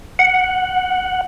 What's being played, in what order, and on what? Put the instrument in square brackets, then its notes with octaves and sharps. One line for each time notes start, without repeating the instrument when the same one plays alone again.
[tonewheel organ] F#5